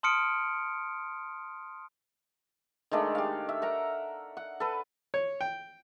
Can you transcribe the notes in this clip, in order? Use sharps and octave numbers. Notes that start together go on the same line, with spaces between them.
A5 C6 D#6 F6 C#7 D7
D#3 G#3 A3 D4
G4 F5
E5
A#4 F#5 A#5
F#5
A4 B4
C#5
G5